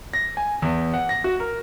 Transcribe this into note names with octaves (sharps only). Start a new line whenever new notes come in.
A#6
G#5
E2
F#5
A#6
F#4
A#4